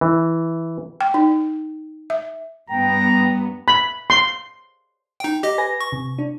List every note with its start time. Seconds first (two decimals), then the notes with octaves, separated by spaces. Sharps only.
0.01 E3
1.01 G5
1.14 D#4
2.10 E5
2.70 G2 B3 G5 A#5
3.68 B5
4.10 C6
5.20 D#4 G5
5.43 G4 D#5
5.58 B4 G#5 A#6
5.81 C#6
5.92 C3
6.18 D4